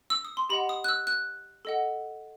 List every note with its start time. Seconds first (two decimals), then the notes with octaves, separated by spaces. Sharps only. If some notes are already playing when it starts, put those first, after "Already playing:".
0.10 E6
0.25 D#6
0.37 C6
0.49 G4 D#5 F#5 B5
0.69 D#6
0.84 F#6
0.89 E6
1.07 F#6
1.65 A4 D#5 F#5